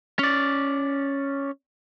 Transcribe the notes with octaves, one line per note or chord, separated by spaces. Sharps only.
C#4 D5